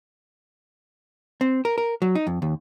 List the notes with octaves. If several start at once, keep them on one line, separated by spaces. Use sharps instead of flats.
C4
A#4
A#4
F#3
D#4
F2
D#2